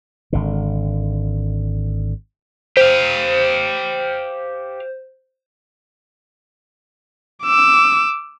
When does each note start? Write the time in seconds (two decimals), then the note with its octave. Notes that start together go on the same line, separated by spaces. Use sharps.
0.33 G#1 D3
2.77 G4 C5 F5
7.43 D6 E6